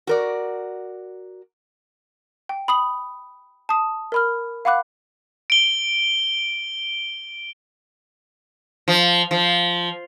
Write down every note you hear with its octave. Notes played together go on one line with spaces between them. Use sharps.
F#4 A#4 D5
G5
B5 D#6 F#7
A5 D#6
A#4 B5 F6
F5 F#5 B5 D6 F#6
D7 G7
F3
F3